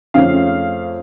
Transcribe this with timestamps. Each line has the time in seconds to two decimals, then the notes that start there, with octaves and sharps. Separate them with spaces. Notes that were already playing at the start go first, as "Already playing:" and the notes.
0.14 F2 C#3 A3 C#4 F5